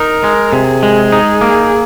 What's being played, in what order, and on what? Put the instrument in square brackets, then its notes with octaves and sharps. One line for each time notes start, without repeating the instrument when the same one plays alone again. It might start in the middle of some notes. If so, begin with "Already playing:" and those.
Already playing: [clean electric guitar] D#4 [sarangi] A#4
[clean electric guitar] G#3
[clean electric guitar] C3 [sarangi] G#4
[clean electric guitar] G#3
D#4
A#3